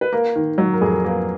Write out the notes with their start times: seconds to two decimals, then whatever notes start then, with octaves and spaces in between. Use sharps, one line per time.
0.01 B4
0.13 A#3 A#4
0.36 D#3
0.58 F#3
0.73 A#4
0.81 F2 G#4
0.90 A#4
1.04 A#3 B4